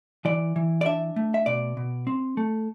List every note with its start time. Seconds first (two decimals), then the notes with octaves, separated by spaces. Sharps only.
0.25 E3 D5
0.56 E3
0.81 D5
0.86 D4 E5
1.16 A3
1.34 E5
1.46 B2 D5
1.77 B2
2.07 C4
2.37 A3